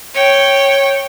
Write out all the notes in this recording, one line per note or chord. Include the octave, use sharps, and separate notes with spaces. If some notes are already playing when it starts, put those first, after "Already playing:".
C#5 G5